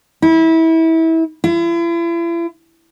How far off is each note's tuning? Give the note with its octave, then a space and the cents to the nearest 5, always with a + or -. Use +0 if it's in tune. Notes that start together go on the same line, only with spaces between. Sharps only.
E4 -25
E4 +40